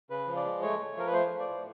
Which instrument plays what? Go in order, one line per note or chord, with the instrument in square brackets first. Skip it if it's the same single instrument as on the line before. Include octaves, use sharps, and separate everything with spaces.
[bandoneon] C#3 B4
F3
D5
G#3
A3 C#5
A3
F3 A#4
B4
A3 C5
F3
D5
A2